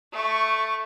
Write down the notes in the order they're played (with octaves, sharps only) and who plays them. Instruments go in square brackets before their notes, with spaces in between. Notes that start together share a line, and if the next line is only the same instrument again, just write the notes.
[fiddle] A3 C#6